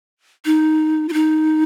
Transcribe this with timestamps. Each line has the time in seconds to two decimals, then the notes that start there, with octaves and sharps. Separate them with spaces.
0.45 D#4
1.09 F4
1.13 D#4